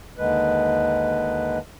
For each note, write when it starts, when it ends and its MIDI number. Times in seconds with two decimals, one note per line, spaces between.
0.18 1.59 39
0.18 1.59 50
0.18 1.59 56
0.18 1.59 71